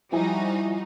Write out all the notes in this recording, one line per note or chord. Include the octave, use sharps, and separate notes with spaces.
F3 G3 D#4 E4 F#4 G#5